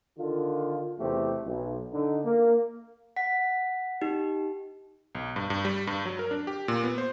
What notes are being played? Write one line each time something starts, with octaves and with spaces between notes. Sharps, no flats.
D3 D#3 F4
E2 C3 A3 C4 G4
B1
D3 D#4
A#3
F#5 B6
D#4 G4
B1
G2
G2
G3
G2
F#3
A#4
D4
G4
A#2
B3
C5